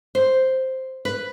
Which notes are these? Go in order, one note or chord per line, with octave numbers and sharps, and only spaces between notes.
C5
B4